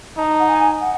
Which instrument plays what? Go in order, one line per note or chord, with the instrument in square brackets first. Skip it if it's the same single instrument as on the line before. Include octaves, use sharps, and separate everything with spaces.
[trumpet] D#4 [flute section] A5
[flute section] F#5
G#5
F#5